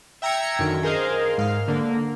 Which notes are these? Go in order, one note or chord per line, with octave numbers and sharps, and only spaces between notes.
E5 G5 A#5 E6 G#6 C#7
F#2 D3 D#3
G#4 A#4 C5 D#5 F5
G#2 F5
D3 A#3